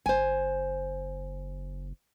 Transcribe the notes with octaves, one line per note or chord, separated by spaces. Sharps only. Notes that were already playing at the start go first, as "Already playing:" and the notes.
F#1 C5 G#5